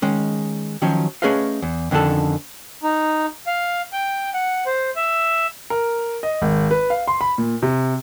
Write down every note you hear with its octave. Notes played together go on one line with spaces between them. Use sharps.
D#3 G#3 C#4
D#3 F3 F#3 C#4
A3 C#4 G#4 B4 D#5 F5
E2
F2 D3 D#3 C#4 D4 A4
D#4
F5
G5
F#5
C5
E5
A#4
D#5
G#1
B4
F5
C6
B5
A#2
C3